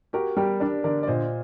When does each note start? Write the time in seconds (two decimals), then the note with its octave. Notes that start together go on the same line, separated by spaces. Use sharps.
0.13 F#4 G4 A#4
0.37 G3 G4 A#4
0.60 D4 A#4 D5
0.84 D3 A#4 D5
1.03 D5
1.07 A#2 C5 D#5